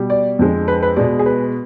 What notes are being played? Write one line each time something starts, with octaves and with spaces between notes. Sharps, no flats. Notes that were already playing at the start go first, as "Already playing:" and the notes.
Already playing: B2 G3
D5
F2 D3 G#3
B4
B4
B2 G#3 D5
G#4
B4